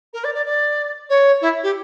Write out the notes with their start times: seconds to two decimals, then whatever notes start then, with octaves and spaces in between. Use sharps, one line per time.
0.13 A#4
0.24 D5
0.34 D5
0.46 D5
1.09 C#5
1.41 E4
1.63 G4